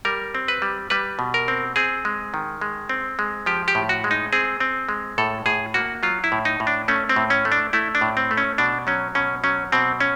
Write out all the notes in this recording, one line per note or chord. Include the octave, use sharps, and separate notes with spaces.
G3 A#4
C4
B4
G3
G3 B4
B2
A#4
C4
C4 G#4
G#3
D#3
G#3
C4
G#3
F3 G4
G4
A2
F#4
G#3
D#4
C4 G#4
C4
G#3
A2 A4
A2 G#4
A#3 F#4
F#3 F4
E4
A2
D#4
A2
D4
A3 C#4
C4
A2
C#4
A3
D4
A3 E4
D4
A2
C4
A3
C#4
B2 D4
F#3 C#4
B2 C#4
F#3 C#4
B2 C4
C#4